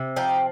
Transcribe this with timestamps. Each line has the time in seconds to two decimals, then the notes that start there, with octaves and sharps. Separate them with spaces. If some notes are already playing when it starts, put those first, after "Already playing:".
Already playing: C3
0.16 F3 D#4 G4